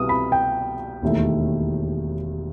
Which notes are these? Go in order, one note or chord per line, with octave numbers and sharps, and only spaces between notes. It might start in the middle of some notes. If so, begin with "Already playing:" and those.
Already playing: C2 B2 G3 B3 E4 D#6
B5
G5
E1 D#2 D#3 A3 E4